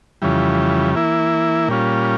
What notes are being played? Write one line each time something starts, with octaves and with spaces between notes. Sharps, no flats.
F2 C#3 E3 G3
E3 A#3 E4
A#2 G3 C#4 F4